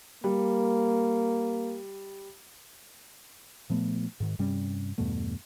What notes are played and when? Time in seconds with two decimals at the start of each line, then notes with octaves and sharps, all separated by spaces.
0.24 G3 A#3
3.70 A#2 F3 A3 B3
4.20 G#2 D#3
4.39 G2 C3 G3 C#4
4.98 E2 G2 B2 A3